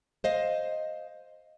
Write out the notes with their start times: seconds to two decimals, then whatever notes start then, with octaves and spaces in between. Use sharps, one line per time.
0.24 C5 D#5 F5